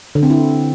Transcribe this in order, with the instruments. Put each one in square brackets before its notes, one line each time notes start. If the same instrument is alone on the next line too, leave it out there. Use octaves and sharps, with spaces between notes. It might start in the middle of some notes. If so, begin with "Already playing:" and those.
[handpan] D3
C4
E4